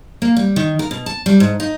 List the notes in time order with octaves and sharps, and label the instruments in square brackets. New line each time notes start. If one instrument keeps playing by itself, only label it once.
[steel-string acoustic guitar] A#3
G3
D#3
A#4
B2
A5
G3
G#2
D#4